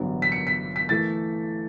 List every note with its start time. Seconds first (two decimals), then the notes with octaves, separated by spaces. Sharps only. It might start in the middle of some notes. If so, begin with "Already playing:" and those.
Already playing: A1 G2 D3 F#3 B3
0.22 B6
0.32 C#7
0.47 B6
0.76 B6
0.89 E3 A3 A6